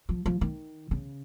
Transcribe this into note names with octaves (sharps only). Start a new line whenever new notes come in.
F3
F3
D#3
C#3